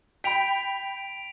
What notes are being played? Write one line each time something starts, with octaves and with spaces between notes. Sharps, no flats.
G5 B5 B6 D7 F7